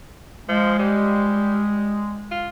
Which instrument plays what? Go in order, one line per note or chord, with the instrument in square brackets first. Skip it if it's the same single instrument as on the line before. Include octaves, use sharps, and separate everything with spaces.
[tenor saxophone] F3 [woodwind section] G#3
[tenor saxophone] G3
F4